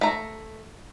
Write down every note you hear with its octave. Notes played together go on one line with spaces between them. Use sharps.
A3 A#5